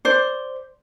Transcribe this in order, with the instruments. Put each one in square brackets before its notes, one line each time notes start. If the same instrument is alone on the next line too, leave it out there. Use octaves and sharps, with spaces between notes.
[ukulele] C5 D5